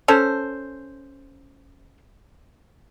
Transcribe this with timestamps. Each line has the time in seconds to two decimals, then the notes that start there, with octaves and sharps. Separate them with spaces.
0.08 C#4 A4 C5